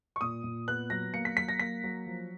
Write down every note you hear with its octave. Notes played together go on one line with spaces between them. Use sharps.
C#6
A#2 D#6
A#2
B3 F#6
F#3 A#6
A#3 C#7
B6
F#3 B6
A#6
A#3 B6
F#3
F3